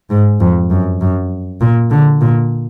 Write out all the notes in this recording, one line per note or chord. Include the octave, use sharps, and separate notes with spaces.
G#2
F2
F#2
F#2
A#2
D3
A#2